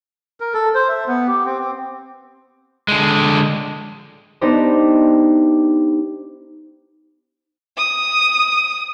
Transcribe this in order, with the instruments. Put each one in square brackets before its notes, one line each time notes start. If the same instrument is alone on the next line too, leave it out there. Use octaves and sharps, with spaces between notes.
[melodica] A#4
A4
C5
E5
B3
G4
C4
C4
[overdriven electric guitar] D3 G#3
[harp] B3 D4 D#4 G4 C5
[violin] D#6